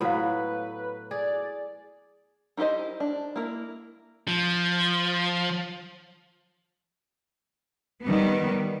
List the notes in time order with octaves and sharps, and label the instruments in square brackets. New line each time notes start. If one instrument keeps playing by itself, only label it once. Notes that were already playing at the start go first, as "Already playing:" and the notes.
[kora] A2 F#3 B3 [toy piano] A4 C5 F5 [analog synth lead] B4
[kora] G#4 [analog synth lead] D5
[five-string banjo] D#4 E4 G4 C5 D#5
D4
A#3 E4 A#4
[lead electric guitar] F3
[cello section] D#3 G3 B3